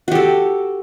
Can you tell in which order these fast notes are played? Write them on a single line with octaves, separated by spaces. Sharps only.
F#4 G4 A4